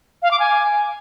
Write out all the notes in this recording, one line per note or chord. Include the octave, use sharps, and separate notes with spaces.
F5
D6
G#5